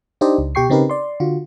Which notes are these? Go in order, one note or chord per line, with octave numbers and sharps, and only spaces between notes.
D4 D#4 G4 C5 D5 D#5
C#2
B2 G4 G5 C#6 C7
C#3 C4 D#4 G4 A#4 B4
D5 C6
D3 F4 F#4